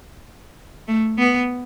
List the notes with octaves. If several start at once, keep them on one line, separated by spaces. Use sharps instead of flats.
A3
B3